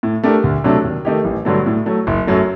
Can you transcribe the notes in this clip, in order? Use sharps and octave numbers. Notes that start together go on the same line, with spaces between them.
A2
A3 D4 G4 A#4
D2
C3 F#3 A3 D4
D#2
D#3 A3 D#4 G4
A1
G2 D3 F#3 A3
A2
F#3 A3
F#1
F#2 F#3 A3